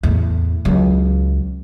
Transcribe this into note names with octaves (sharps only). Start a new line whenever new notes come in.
E2 A2
C#2 F#3